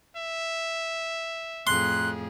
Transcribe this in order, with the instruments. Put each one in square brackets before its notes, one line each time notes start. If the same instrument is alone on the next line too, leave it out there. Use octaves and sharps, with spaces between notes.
[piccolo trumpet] E5
[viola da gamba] F2 A2 G#4 [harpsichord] C6 [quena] F#6